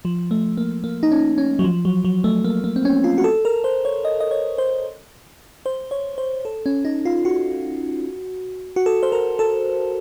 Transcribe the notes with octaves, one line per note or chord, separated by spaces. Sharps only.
F3
A3
A#3
A#3
D#4
C#4
C#4
F#3
F3
F#3
F#3
A3
A#3
A#3
C4
C#4
F4
F#4
A4
A#4
C5
C#5
D#5
D#5
C#5
C5
C5
C#5
C5
A4
C#4
D#4
F4
F#4
F#4
A4
C5
A#4
A4